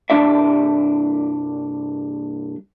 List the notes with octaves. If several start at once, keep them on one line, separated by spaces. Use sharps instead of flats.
C2 G2 C3 D4 D5 E5